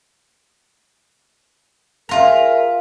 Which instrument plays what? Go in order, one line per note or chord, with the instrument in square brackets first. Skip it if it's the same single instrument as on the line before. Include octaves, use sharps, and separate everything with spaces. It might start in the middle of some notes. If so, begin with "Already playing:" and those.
[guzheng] F4 A#5 [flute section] G#4 A#4 E5